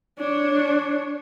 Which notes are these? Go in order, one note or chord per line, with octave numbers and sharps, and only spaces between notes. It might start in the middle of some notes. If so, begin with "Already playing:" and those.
D4 C#5